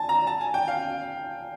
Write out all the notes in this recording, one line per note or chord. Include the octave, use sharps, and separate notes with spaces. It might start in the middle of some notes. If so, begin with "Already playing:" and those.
Already playing: G#5 A5
A#5
A5
G#5
G5
F5